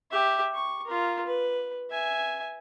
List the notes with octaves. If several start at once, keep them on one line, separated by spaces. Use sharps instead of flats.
G4 E5
C#6
F4 A#4
B4
E5 G#5